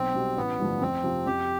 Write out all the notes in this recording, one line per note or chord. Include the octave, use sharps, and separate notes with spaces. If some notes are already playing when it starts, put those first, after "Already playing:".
Already playing: B1 C4
B2 G3
A1 B3
G2 D3 F3 A3
F2 C4
C3 F3
F2 G4